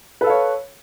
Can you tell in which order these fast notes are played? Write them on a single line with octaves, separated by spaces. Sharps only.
B4 A4 F5 C#5